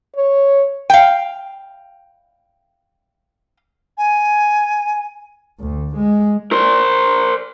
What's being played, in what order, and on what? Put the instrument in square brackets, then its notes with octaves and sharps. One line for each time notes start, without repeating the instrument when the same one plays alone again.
[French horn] C#5
[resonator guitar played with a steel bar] F5 G5
[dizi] G#5
[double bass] D2
G#3
[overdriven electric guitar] A#4 C5